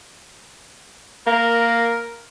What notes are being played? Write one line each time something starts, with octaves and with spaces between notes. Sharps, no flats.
A#3 A#4